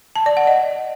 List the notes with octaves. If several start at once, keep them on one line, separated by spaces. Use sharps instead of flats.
A5
D5
F#5
D#5